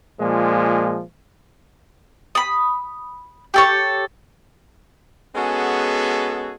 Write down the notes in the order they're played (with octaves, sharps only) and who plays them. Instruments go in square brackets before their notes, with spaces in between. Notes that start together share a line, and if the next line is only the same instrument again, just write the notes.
[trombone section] A#2 F3 G#3
[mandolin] B5 D#6
G4 A4 C#5
[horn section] G#3 B3 C#4 F#4 G#4 A4